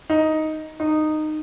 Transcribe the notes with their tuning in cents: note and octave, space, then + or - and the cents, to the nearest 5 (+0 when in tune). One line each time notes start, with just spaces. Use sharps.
D#4 +5
D#4 -15